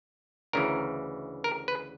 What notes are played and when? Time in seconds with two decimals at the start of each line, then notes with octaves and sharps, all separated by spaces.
0.53 D2 C#3 E3 A#4
1.44 A#4
1.68 B4